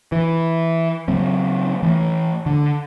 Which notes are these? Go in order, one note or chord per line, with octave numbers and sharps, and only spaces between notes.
E3
C#3 F#3 A#3 C4
E3 A3
D3